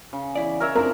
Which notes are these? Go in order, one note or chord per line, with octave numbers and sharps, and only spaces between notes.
C#3
E2 E4 D5
A#4 C#5 E5
F3 C4 D4 E4 A#4